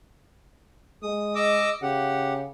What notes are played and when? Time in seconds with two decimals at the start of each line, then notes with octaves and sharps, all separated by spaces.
1.03 G#3 D#6
1.35 D#5 D6 E6
1.82 C#3 G4 F#5